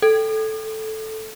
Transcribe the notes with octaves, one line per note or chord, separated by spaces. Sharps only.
A4